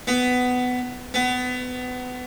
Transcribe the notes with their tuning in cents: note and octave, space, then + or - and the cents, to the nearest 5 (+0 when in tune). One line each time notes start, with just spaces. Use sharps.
B3 +15
B3 +25